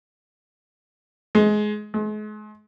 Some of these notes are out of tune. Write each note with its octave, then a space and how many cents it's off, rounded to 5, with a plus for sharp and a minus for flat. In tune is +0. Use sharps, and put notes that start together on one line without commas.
G#3 +20
G#3 +40